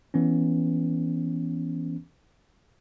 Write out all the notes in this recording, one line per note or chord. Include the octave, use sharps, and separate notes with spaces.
E3 B3 C#4